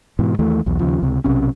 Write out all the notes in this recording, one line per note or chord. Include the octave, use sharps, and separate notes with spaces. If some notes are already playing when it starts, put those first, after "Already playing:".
G#2 B2 E3
D#2 E3 A3
B1 E2 B2
D#2 C#3 F3
C#2 C3
B1 C3 C#4